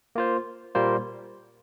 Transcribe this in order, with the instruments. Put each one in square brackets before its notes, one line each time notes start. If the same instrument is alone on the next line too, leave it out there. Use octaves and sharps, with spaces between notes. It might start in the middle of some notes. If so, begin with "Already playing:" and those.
[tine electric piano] A#3 F4 C5
A#2 G3 A#3 F4 C5